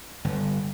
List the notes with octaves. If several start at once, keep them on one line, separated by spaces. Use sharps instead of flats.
G1